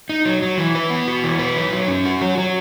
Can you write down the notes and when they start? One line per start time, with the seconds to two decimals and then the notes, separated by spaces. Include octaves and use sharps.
0.09 D#4
0.25 F#3
0.42 F#3
0.58 E3
0.75 B4
0.90 B3
1.08 F#4
1.24 E3
1.39 B4
1.56 F#3
1.73 F#3
1.88 C#4
2.05 F#4
2.21 F#3
2.38 F#3